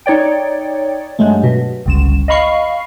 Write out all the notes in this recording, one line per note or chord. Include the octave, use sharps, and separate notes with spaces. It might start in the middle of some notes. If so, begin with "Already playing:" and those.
D#4 C#5 D5 G5
G2 F#3 G#3 A3
B2
G1 C#2 E7
D#5 F5 B5 C#6 C7